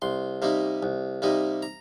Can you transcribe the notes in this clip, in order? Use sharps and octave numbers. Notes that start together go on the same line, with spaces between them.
C2 C6
C3 G3 A#3 D#4
C2
C3 G3 A#3 D#4
A#5